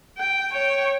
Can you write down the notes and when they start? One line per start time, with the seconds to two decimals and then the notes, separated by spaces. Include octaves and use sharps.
0.18 G5
0.52 C#5 G5